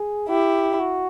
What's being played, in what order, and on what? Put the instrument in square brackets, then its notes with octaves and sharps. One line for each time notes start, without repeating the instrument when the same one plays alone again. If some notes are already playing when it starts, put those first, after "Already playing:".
Already playing: [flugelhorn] G#4
[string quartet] E4 [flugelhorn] G4
[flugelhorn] F#4